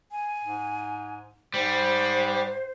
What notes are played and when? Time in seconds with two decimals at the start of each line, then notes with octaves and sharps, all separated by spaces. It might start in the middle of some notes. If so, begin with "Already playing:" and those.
0.11 G#5
0.43 G#2
1.54 G#2 G3 C5